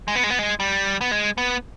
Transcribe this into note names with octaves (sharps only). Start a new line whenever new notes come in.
G#3
B3
G#3
B3
G#3
G3
B3
G#3
B3